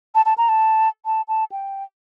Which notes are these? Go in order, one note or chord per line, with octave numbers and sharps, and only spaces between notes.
A5
A5
A#5
A5
A5
A5
G5